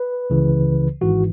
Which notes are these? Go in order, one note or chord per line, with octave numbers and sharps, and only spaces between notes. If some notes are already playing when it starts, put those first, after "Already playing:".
Already playing: B4
C#2 C#3 E3
G#1 G#2 E3 F#4